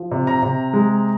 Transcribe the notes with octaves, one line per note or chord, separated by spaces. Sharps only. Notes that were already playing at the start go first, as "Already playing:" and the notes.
Already playing: F3
C3
A#5
C3
G#3